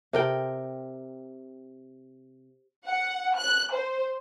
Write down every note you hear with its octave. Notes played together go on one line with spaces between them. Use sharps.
C3 A#4 G5
F#5
F#6
C5